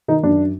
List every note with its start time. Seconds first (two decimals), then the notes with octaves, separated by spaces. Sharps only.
0.08 D#3 D#4
0.23 F#2 D4